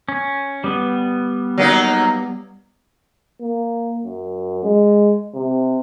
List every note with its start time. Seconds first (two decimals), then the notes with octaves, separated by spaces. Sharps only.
0.09 C#4
0.64 G3 B3
1.58 F#3 A#3 D#4
3.41 A#3
4.05 F#2
4.64 G#3
5.34 C3